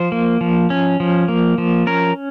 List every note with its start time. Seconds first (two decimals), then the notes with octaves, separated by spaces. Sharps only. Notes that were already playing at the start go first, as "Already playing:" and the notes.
Already playing: F3 C5
0.12 A#3
0.41 F3
0.70 C#4
1.00 F3
1.28 A#3
1.58 F3
1.87 C#4 A#4